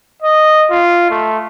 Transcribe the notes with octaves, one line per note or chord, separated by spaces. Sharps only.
D#5
F4
A3